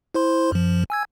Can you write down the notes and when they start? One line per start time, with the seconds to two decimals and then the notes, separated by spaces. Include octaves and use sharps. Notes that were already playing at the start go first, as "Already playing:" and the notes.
0.14 E4 C5 C6
0.52 F#2 F3
0.90 G#5 E6 G#6